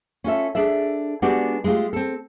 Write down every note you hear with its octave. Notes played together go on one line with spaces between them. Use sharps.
C#4 F4 A4 E5
D4 G#4 A4 E5
G#3 B3 D4 F#4 G4 D5
G#3 A3 C#4 F4 G4
C4 A4